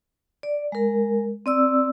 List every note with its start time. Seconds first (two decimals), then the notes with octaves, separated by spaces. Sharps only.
0.43 D5
0.72 G#3 A#4
1.46 C4 D5 E6